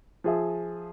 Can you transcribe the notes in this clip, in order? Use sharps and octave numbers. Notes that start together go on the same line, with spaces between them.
F3 G#4 E5